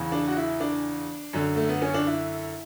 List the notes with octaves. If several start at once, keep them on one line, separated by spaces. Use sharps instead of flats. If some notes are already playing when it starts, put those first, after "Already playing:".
Already playing: E2 C#3 E3
D4
F#4
E4
D4
F#2 D3
A3
B3
C#4
D4
E4